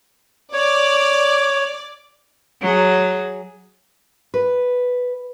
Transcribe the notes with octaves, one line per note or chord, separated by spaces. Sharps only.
C#5 D5
F#3 G#4
B4